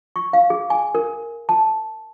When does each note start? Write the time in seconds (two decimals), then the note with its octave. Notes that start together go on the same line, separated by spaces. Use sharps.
0.16 C#6
0.33 F5
0.50 G#4
0.70 G#5
0.95 A#4
1.49 A5